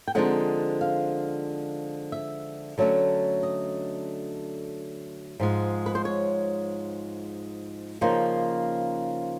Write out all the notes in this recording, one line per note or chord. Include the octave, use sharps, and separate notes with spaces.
G5
D3 F3 G#3 C4 D#4 F#5
F5
E5
D3 F#3 A3 C#4
D#5
G#2 F3 G#3
B4
C5
C#5
C#3 F3 A#3 D#4 C5